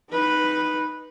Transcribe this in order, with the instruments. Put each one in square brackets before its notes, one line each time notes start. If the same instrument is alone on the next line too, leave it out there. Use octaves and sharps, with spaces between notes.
[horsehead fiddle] D#4 B4